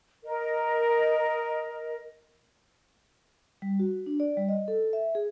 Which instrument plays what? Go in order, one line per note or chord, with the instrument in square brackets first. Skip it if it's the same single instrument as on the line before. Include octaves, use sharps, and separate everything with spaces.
[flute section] A#4 D#5
[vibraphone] G3
F#4
D4
D5
G3
D#5
A4
E5
G#4